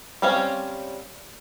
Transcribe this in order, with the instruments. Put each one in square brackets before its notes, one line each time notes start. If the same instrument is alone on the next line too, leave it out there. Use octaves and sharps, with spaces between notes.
[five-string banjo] G3 C4 C#4 C#5 F5